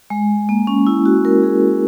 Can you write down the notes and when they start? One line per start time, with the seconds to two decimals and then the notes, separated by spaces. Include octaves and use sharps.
0.10 G#3
0.49 A#3
0.67 C#4
0.87 E4
1.05 F#4
1.25 A#4
1.43 G#4